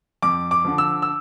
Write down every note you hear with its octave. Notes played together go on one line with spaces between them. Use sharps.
F2 D6
D6
D3 F3
E6
E6